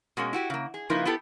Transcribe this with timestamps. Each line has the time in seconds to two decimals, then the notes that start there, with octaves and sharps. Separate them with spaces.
0.17 B2 G#3 A#3 C#4
0.33 E4 F#4 G4
0.50 C#3 A#3
0.74 G#4
0.90 C#3 F3 A#3 D#4 E4 B4
1.05 B3 E4 G4 A4